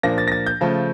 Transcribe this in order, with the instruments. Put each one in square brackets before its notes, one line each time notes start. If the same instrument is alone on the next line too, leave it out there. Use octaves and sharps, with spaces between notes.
[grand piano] A#2 F3 A#3 D4 A#6
A6
A#6
A6
G6
C#3 F3 A3